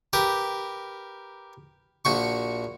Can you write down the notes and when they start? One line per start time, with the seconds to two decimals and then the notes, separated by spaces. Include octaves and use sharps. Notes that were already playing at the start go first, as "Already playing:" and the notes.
0.13 G4 A#4 B4
2.05 A#1 F#4 C#6